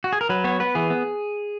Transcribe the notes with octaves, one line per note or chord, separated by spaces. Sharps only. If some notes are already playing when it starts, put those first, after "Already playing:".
F#4
G#4
A#4
F#3 B4
B3 C#5
B3 B4
E3 G#4
B3